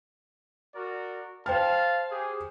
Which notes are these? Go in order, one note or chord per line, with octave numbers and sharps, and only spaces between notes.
F#4 A#4 D5
C5 F5 G5 A5 F6
G4 G#4